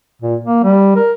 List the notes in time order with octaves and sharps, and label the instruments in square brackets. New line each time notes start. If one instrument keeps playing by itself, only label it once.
[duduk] A#2
A#3
G3
A#4